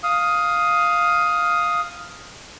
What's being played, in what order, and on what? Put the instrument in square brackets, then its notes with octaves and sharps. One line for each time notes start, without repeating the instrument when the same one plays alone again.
[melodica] F5 D#6